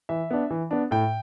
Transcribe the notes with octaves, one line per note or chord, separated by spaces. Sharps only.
E3 E5
B3 D4
E3
B3 D4
A2 G5